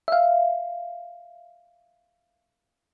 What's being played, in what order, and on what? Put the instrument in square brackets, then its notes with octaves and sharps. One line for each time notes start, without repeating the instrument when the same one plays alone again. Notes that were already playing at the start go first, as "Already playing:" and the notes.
[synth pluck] E5 F5